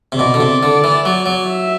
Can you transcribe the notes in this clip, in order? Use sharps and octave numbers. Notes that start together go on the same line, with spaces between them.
C3
B2 D5
D3
C3
D3
E3
F#3
F#3
E5